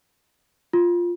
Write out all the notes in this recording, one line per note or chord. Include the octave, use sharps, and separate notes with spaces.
F4